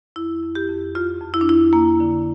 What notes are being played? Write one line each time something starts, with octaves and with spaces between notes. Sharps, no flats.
F2 E4
F2
G4
F2
F2 F4
F2
E4
D4
F2 E4
F2 A#3
D3